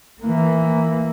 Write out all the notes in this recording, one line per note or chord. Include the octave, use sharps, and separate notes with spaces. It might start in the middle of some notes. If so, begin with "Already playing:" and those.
E3 A#3